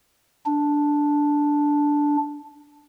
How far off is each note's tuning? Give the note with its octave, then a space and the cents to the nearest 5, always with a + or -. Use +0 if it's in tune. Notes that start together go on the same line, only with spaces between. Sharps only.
D4 -5